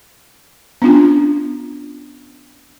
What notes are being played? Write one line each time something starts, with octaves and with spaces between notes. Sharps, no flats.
B3 C#4 D4 F4